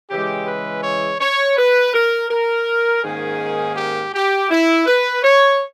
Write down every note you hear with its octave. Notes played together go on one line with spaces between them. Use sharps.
C#3 E3 G#3 G4
B4
C#5
C#5
B4
A#4
A#4
G#2 D#3 A#3 C#4 G#4
G4
G4
E4
B4
C#5